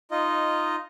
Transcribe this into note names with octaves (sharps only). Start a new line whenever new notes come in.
D#4 F4 D#5